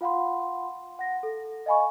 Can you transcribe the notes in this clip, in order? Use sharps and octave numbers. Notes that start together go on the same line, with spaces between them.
F4 F5 F#5 B5 C6
F#5 A#6
A4
D#5 F5 G#5 B5 C#6